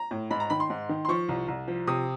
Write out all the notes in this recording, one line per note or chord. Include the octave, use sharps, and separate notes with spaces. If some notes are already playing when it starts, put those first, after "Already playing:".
Already playing: A#5
A2
G#2 B5
A#5
D#3 B5
C6
G#2
D#3
C6
F3 C#6
C2
C2
F3
C3 D#6